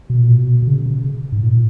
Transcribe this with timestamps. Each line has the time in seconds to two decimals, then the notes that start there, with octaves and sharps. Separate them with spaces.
0.10 B2
0.20 A#2
0.29 B2
0.62 B2
0.68 C#3
0.86 C#3
1.32 G#2
1.43 A#2